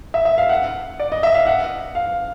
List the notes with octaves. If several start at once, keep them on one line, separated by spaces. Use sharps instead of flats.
E5
E5
F5
F#5
D5
D#5
E5
F5
F#5
F5